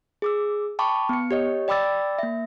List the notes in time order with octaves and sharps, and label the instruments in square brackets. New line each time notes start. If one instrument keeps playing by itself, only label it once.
[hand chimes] G#4 D6 E6
G5 A5 B5 C#6 D6
B3 C#7
G4 C#5 D#5
D5 G5 B5 D6 E6 A6
A#3 E5